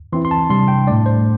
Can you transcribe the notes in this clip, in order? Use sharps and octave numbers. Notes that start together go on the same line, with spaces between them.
E3 C4 E4 C6
C6
A5
C3 G3 D4 C6
G5
A2 A3 D4 D5
C5